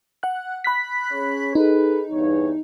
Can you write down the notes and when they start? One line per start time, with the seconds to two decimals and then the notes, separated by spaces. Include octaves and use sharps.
0.23 F#5 F#6
0.64 B5 F#6 B6
1.12 C#4 G#4 C#5
1.55 D#4 G#4 A4 B4
2.12 E2 G2 C#5